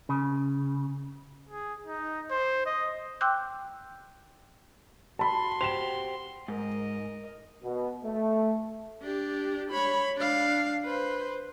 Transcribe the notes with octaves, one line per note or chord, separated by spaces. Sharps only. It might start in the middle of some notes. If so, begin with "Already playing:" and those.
C#3
G#4
D#4
C5
D#5
G5 C6 D6 E6 F#6 G6
F#4 A5 B5 C6
G4 C5 E7 F7
G#2 A#4 D#5
B2
A3
D4 G4
C#5 B5
D4 F5
B4 C5